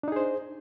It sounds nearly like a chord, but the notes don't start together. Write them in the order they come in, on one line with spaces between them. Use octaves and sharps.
D4 D#4 G#4 C5